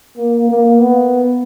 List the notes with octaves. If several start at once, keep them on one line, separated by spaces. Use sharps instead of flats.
A#3
A#3
B3